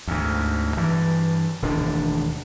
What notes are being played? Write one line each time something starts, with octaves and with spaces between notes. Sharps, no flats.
D2 G#2
G2 E3
E1 D#2 A2 D4